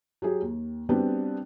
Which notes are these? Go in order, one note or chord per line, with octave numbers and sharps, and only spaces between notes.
F#3 G4 G#4
D#2
G3 B3 C4 D4 F#4 G4